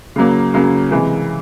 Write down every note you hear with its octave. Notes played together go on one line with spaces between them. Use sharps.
C#3 F#3 A#3
C#3 F#3 A#3
C3 E3 G#3